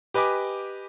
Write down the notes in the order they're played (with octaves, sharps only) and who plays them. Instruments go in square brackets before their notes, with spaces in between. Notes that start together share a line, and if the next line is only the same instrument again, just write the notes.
[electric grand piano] G4 B4 D#5 G#5 D6